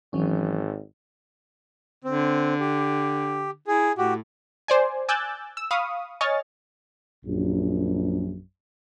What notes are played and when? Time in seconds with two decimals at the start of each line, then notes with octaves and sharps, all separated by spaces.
0.13 G#1 E3 F#3 C#4
2.05 D3 C4
2.60 G4
3.67 E4 G#4
3.98 A2 F#4 G4
4.68 C5 D5 G#5
5.09 G#5 D6 E6 F#6 G6 A6
5.57 E6
5.71 F5 B5 C#6 D#6
6.21 C#5 D#5 G#5 C#6 F6 A6
7.25 A#1 F#2